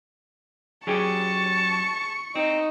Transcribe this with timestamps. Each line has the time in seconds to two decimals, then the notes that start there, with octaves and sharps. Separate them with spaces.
0.87 F#3 C#4 G4 G#4 A5 C#6
2.36 C4 D#4